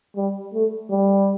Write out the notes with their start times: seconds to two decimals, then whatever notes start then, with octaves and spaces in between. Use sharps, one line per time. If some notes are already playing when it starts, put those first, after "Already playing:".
0.16 G3
0.54 A3
0.90 G3